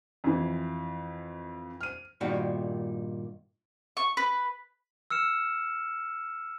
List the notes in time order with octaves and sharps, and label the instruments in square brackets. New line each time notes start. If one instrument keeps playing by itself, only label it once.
[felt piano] F2 E3
F6 D#7
[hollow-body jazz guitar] G2 A#2 D#3 F#4
[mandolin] C#6
B4
[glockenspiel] E6 F6 C#7 E7